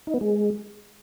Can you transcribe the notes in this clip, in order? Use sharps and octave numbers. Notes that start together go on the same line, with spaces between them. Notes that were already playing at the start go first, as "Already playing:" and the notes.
D#4
B3
G#3